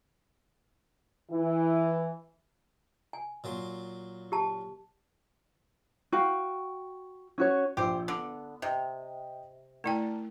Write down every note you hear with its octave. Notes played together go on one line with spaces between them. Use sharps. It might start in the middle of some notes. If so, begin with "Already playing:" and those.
E3
G#5
A#2 F#3 C6
G4 A5
F#4 F5 G5
C#4 F#4 C#5
A#1 G4 C5 E6
D3 B3
C3 D#5 G5
A3 E4 A#4 D5 G5 A5